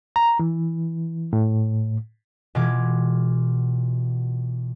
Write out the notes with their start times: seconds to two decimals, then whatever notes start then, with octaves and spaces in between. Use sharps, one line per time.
0.16 A#5
0.39 E3
1.33 A2
2.55 B2 E3 F4 D6 G#6